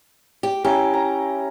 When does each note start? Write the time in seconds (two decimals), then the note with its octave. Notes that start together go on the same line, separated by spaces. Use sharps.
0.43 G4
0.64 C#4 E4 G4 A#5
0.94 A#5